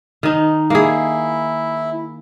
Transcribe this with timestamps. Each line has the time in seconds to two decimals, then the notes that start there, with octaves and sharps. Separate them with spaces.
0.23 D#3 D#4
0.70 A#3 E4 G#4